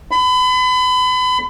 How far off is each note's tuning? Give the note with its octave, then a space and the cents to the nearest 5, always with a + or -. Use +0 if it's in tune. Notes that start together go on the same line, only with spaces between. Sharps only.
B5 +35